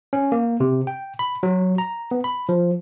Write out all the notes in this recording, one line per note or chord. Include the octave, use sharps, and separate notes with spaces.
C#4
A#3
C3
G5
B5
F#3
A#5
B3
B5
F3